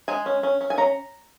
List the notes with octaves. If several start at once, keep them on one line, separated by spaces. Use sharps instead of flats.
G#3 G#5
C#4
C#4
C#4
G#5
C#4 A#5